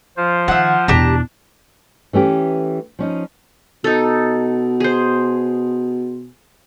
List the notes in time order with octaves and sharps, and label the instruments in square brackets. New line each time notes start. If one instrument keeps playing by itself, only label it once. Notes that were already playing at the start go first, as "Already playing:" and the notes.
[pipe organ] F3 F4 C5
[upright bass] D#3 [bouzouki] E5 F#5
[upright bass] E2 B2 [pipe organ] D4 [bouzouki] G4 A5 A#5
[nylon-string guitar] E3 A3 C#4 G4
F3 C#4 D#4
[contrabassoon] B2 [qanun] D#4 A4
[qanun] G#4 C5